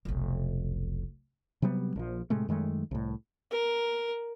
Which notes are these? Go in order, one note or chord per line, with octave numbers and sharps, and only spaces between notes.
F1 B1
C3 F#3 G3 B3
A#1 F3
A2 C3 G#3 A3
F#2 D#3 G#3 A3
C2 A2
A#4